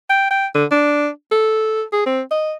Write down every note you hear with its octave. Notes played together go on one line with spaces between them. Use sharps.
G5
G5
D3
D4
A4
G#4
C4
D#5